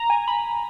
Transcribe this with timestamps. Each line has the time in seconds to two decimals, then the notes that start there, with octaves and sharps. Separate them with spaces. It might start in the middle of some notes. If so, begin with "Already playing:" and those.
Already playing: A#5
0.10 G#5
0.28 B5